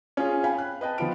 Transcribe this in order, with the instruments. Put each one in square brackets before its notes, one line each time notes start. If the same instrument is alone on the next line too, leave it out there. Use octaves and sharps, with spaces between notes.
[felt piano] C#4 F4 G#4
F5 G5 G#5 B5
F#6
B4 D#5 G5 A5
F3 B3 F4 D7